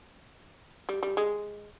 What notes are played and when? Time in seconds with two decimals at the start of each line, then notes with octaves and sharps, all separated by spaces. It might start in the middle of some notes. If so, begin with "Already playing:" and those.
0.89 G3
1.03 G3
1.17 G#3